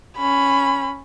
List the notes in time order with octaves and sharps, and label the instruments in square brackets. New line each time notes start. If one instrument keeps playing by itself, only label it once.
[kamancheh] C#4 B5